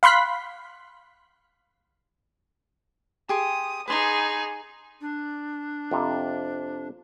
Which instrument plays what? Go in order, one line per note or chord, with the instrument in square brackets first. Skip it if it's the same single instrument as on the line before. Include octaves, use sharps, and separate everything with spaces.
[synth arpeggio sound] F5 B5 C6 F#6 B6
[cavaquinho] G4 G#4 C6 [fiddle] D#6
[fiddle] D#4 G#4 [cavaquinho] B4 C6 D6
[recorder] D4
[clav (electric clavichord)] F2 C3